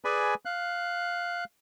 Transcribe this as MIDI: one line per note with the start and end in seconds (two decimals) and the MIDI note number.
0.05 0.34 68
0.05 0.34 71
0.05 0.34 74
0.05 0.34 80
0.05 0.34 83
0.45 1.44 77
0.45 1.44 90